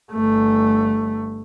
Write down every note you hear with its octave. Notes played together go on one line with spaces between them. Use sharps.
G1 A3